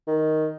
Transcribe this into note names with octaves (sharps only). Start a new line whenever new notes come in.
D#3